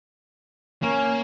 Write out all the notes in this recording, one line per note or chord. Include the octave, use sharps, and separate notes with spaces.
A#3 C#4